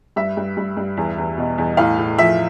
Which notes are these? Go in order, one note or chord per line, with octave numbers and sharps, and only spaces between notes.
G2 E5
G2
G2
G2
E2
E2
B2
E2
A2 F5
A2
F3 E5